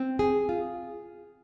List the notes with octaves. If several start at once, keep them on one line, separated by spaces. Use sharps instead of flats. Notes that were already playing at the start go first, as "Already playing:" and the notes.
Already playing: C4
G#4
F4